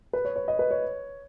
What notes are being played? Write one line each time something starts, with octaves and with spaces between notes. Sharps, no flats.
B4
C#5
C#5
D#5
B4
C#5